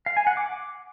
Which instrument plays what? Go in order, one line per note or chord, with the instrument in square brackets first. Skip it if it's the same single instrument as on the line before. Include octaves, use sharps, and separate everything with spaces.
[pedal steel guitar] F5
G#5
F#5
D6